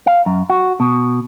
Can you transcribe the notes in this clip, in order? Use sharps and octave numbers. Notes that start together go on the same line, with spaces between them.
F5
F#2
F#4
B2